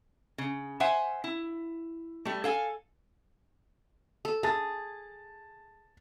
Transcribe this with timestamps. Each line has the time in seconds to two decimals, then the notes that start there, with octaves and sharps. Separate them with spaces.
0.38 C#3
0.80 C5 E5 F#5 G#5
1.24 E4
2.25 G3 A3
2.44 A4 F5 G#5
4.25 A4
4.43 G#4 A5 A6